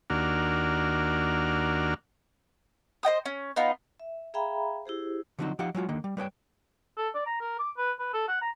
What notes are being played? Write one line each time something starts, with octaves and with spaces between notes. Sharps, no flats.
D#2 A#3 D4 F#4 F6
C5 D#5 G5 D#6
C#4
B3 D#4 F4
E5
G#4 E5 F5 G5 A#5 B5
E4 G4 G#4 C5
D3 F3 F#3 C4 D#4 F#4
F3 D#4 G4 F5 F#5
F#3 G#3 F4 F#4
D3 D#3 A#3
G3
G3 B4 C#5 G5
A4
D5
A#5
A#4
D6
B4
B4
A4
F#5
A#5